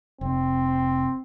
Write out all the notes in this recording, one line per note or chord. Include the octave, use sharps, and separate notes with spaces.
F1 C4